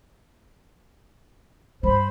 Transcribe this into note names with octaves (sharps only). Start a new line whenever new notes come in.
G2 G3 C5 B5